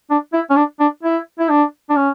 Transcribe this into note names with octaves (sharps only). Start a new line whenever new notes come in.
D4
E4
C#4
D4
D4
E4
E4
D4
D4
C#4